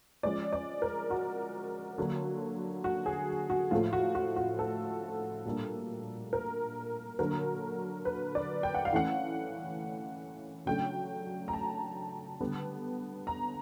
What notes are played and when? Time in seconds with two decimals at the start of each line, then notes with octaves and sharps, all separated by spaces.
0.23 F3 G#3 C#4 D5
0.53 D5
0.82 A#4
1.10 F#4
1.98 D3 F#3 A#3 D4
2.84 F#4
3.06 G#4
3.50 F#4
3.71 A2 F3 A3 F4
3.93 F#4
4.15 F#4
4.36 F#4
4.59 A4
5.45 A#2 G3 A#3 D4
6.33 A#4
7.19 D3 F#3 A#3 D4 A#4
8.05 B4
8.35 D5
8.63 G5
8.74 F#5
8.85 F5
8.92 E3 A3 C#4 F#5
10.66 C#3 F#3 A3 D4 G5
11.48 A#5
11.53 A5
12.40 D3 G3 B3
13.27 A#5